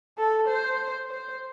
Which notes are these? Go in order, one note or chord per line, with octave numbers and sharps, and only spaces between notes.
A4
C5
C5